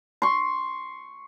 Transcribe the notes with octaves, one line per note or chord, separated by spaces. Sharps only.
C6 C#6